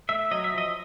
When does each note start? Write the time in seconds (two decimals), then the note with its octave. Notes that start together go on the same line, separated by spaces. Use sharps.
0.09 A3 E5
0.31 F#3 D#5
0.44 E5
0.54 F3 D#5